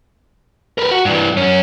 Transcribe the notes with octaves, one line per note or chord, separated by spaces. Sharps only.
A#4 B4
F#4
G2 E3
F#2 C#4